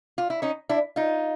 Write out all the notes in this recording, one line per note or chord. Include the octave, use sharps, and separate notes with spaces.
F4
E4
C#4 D#4
D4 E4
D#4 F4